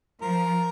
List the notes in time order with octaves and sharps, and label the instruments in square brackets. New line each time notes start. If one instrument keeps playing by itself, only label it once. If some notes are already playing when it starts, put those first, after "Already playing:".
[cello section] F3 [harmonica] A#4